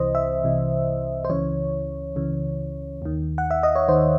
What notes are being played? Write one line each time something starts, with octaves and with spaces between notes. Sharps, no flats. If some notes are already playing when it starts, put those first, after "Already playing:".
Already playing: C2 C3 E3 C5 D#5
E5
C2 C3 E3
C5
C#2 C#3 E3 C#5
C#2 C#3 E3
D#2 D#3
F#5
E5
D#5
C#5
D#2 D#3 C5